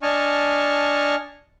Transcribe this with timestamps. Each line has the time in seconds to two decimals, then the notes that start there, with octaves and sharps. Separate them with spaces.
0.02 D4 D#5 G#5 A5 C#6 F6